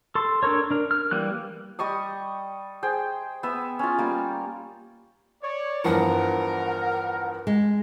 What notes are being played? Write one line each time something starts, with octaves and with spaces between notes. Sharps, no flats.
A4 C6
D4 A4 A#4 C#5
D4 A#4
F6
E3 G3 A#3 F#6
G3 D#5 C#6 D#6
G#4 C5 G5
B3 E5
C#4 F4
G3 A#3
C#5 D5
E2 G2 F3 A#4 F#5
G#3